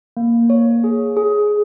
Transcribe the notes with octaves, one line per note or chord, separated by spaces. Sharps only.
A#3
C#5
G#4
G#4